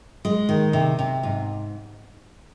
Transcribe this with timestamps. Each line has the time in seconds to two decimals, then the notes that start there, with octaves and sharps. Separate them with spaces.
0.25 G#3
0.49 D#3
0.73 C3
0.99 C3
1.23 G#2